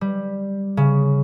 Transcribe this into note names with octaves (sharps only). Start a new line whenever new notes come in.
G3
C#3